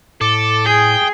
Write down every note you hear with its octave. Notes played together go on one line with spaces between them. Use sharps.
A2 A4 D6
G#4 G5 D#6